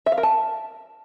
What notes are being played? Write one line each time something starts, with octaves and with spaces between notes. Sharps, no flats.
E5
F5
A#4
A5